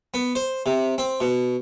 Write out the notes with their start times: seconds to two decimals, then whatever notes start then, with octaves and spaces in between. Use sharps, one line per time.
0.14 B3
0.35 C5
0.66 C3
0.98 C4
1.21 B2